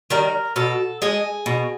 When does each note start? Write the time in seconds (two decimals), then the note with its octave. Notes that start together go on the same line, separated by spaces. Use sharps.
0.10 D#3 G3 A#4
0.56 B2 A4
1.02 G#3 G#4
1.46 B2